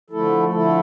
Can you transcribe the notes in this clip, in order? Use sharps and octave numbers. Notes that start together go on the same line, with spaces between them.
D3 F3 A3 E4 A4
D3 A3 E4 A4